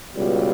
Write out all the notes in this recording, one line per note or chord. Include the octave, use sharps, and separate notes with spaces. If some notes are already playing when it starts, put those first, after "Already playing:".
C#2 B2 G3